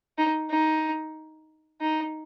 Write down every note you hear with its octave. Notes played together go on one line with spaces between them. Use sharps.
D#4
D#4
D#4